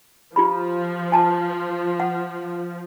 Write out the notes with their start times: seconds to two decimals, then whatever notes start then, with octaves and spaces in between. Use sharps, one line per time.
0.36 F3 F4 G4 B5
1.12 G#5 A5
2.00 F#5